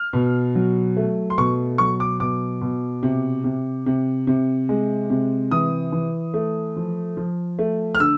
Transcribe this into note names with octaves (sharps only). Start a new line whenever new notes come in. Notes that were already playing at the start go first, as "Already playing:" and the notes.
Already playing: F6
B2
F#3
A3
C6
B2 C#6
F#3 C#6
D6
B2 D6
B2
C3
C3
C3
C3
G#3
C3
E3 D#6
E3
A3
F3
F3
A3
F6
D3 E6